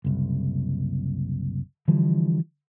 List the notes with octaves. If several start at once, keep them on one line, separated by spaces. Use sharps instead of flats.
F#1 C2
D3 E3 F3 G3